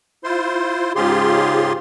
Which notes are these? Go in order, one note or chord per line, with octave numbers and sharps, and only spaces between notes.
E4 F4 C5 C6
G#2 C#3 F4 G4 G#4 C6